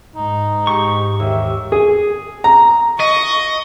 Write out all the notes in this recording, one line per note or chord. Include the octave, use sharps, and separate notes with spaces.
G#2 D#4
G4 C#6
D#2 E5
G#4
A#5
D#5 C#6